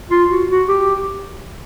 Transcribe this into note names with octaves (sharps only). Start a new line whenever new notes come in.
F4
F#4
F#4
G4